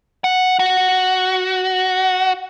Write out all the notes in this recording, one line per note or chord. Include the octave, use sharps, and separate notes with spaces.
F#5
F#4